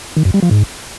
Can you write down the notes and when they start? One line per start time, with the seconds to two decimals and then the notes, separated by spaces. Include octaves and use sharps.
0.17 D#3
0.25 F#2
0.34 G3
0.42 F3
0.51 G#2